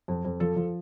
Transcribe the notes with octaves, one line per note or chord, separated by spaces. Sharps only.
F2
F2
F3 A4
F3